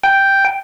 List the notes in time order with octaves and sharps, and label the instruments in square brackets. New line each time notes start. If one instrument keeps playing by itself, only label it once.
[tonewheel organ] G5